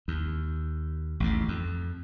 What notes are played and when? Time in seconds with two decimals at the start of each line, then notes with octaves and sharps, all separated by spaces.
0.08 D#2
1.20 A1 D#2 G#2
1.48 F2